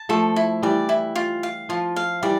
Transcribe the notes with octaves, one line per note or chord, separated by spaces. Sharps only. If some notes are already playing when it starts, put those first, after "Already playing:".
Already playing: A5
F3 A3 A4
E4
E3 G3 D5
E4
F4
F5
F3 F4
F5
E3 G3 D5